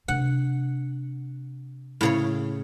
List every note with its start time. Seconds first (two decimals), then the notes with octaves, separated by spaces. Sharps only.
0.08 C3 D4 F#5
2.01 A2 C#3 C#5